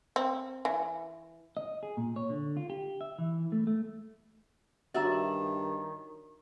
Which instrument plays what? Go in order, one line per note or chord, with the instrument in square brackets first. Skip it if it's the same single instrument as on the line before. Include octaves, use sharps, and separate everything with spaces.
[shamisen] C4
E3
[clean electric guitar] D#5
G#4
A#2
C#5
D3
F4
G4
E5
E3
A3
A3
[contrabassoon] G2 [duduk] D#3 [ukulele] F#4 C#5 A#5 [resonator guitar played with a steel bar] D5 E5